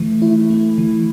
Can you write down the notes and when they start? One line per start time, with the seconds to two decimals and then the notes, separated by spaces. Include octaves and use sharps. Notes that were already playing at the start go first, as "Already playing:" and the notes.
Already playing: E3 A3
0.22 E4
0.50 A3
0.78 E3